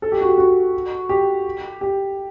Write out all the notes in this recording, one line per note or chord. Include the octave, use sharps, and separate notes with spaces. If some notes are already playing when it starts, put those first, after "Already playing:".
A4
G4
F#4
G4
F#4
G4
G4